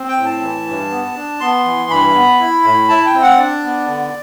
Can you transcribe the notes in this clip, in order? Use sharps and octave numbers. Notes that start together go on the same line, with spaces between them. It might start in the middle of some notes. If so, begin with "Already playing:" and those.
Already playing: C4
G5
A2
A5
E3
G2
B3
D4
B3 C6
E3
G2 B5
B3
E4
A2
E4 A5
G5
C4
F#5
D4 D5
B3
D3